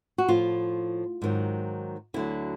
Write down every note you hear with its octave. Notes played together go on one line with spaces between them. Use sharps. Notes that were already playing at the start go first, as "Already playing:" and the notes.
F#4
A2 F3 F4
G#2 D#3 F#3
D2 D3 F#3 E4